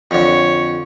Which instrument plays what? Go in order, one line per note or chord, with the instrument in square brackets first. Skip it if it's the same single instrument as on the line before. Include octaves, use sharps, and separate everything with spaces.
[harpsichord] F2 D3 [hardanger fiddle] C#5